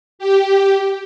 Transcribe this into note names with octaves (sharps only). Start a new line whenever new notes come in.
G4